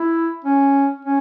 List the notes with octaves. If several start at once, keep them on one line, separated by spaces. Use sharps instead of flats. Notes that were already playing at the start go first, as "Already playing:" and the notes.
Already playing: E4
C#4
C#4